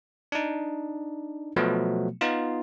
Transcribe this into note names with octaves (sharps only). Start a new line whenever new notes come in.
D4 D#4
B2 F3 F#3 A3 B3
B3 D#4 F4